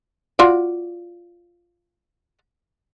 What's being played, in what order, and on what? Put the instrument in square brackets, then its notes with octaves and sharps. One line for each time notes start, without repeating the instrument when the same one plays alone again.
[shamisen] F4 F#4 D5